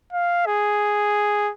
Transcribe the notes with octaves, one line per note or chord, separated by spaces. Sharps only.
F5
G#4